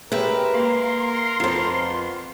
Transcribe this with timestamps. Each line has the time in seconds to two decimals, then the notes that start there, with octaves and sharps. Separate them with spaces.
0.12 G#3 G4 A#4 B4 E5
0.54 A#3 C6
1.40 F2 B3 F4 C5